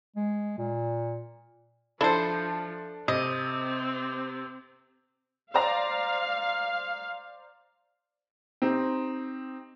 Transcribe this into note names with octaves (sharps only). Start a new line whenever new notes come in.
G#3
A#2
F3 D4 E4 A4 C5
C3 C4 D#5
C5 D5 F5 A#5
C4 D#4 G4